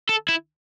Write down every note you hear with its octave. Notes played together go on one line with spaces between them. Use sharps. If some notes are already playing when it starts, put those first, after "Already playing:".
A4
E4